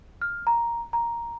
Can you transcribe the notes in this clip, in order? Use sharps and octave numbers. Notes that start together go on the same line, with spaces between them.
F6
A#5
A#5